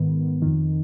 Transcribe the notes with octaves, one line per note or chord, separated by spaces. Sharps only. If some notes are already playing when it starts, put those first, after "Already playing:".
Already playing: G#2 D#3 B3
F2 D#3